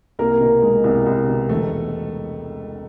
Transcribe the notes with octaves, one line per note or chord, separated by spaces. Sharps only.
C2 A#3 A#4
B2
G#3
C2
C2
B2
E1 A3 A4